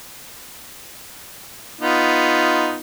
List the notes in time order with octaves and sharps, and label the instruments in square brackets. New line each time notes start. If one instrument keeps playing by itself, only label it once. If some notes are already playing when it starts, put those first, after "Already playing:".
[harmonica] B3 D#4 F4